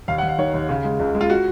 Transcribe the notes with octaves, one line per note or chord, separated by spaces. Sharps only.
D#2 F5
F#5
D#2
F5
D#3 C#5
D#2
C#3
G#3
C#2
G#3
F4
F#4